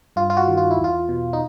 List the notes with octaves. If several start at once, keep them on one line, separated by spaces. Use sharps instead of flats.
G2 F4
F4
F#4
D#3
F4
E4
E2
F4
B2
D#4